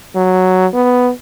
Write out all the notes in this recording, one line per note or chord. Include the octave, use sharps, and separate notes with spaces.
F#3
B3